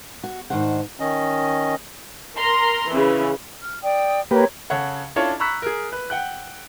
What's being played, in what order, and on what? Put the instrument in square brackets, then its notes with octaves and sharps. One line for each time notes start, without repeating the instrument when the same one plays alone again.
[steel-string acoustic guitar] F#4
G#2 D#3 D4 C5 F#5
[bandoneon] D#3 C#4 D#5
[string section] A#4 A#5 C6
C#3 E3
[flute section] F6
D5 G5 D#6
[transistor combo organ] A#3 G4 B4 [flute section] A#4 C#5
[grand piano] C#3 A4 C#5 F#5
C#4 D4 E4 F4 A4 C#5
A#5 B5 C#6 E6 F#6 B6
G#4 A#4
B4
F#5 G5 F#6